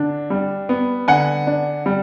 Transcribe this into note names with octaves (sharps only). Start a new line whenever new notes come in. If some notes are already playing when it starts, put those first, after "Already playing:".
Already playing: D3 D4
G3
B3
D3 F#5 G#5
D4
G3